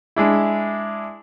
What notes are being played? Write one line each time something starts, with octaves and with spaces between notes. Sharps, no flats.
G#3 D4 E4